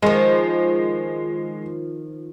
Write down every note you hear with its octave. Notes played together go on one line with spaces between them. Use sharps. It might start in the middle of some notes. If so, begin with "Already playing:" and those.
D#3 F3 G#3